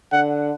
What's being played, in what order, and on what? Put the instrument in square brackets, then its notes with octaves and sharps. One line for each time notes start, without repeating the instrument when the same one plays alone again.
[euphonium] D3 [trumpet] F#5